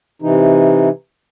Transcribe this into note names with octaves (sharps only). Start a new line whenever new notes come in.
C3 E3 D#4